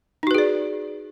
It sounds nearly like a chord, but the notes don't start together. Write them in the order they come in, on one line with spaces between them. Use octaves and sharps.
D#4 F#4 B4 G#4 D5